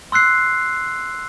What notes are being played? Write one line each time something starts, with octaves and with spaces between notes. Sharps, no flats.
C6 E6 F#6 C7